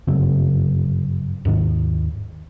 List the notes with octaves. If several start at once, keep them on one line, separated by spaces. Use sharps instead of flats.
G1 F#2 C#3 C4
D#2 G#2 D#3